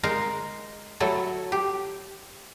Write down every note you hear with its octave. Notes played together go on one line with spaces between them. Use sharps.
G#3 D#4 A#4 F5 A#5
F#3 A3 E4 A4
G4